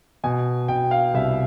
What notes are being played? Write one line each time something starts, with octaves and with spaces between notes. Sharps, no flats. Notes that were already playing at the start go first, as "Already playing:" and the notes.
B2 G#5
B2 G5
F5
C2 E5